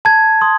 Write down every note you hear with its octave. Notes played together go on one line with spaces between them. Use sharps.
A5 G#6
C6 D#6